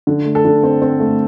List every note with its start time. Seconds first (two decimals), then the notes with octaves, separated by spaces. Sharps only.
0.07 D3
0.25 A3
0.35 A4
0.45 D3
0.63 C4
0.82 C4
1.00 A3